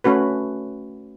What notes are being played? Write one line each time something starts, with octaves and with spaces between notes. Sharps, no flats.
A3 C#4 F#4 B4